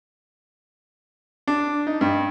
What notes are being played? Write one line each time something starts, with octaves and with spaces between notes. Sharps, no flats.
D4
D#4
G2